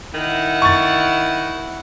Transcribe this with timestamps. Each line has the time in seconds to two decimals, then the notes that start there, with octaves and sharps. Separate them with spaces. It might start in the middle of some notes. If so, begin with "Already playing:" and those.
0.14 D#3 E4 F#5
0.62 C#6 A6